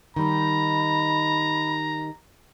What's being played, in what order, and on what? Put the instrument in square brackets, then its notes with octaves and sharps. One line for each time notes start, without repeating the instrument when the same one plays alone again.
[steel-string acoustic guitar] D#3 G3 D#4 [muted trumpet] A#5 [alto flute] B5